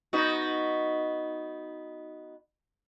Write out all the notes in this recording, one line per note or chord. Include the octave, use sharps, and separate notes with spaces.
B3 D#4 F#4